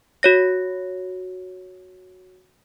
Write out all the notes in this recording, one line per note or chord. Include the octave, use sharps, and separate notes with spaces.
F#4 C#5 A#6